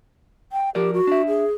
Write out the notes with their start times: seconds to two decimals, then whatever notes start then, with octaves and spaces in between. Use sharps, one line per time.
0.52 G5
0.75 F3 G4 A#4 D5
0.94 F#4
1.07 D4 E5
1.28 G#4